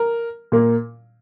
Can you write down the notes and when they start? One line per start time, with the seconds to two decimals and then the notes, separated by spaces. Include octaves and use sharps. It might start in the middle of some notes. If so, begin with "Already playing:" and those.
Already playing: A#4
0.52 A#2 A#3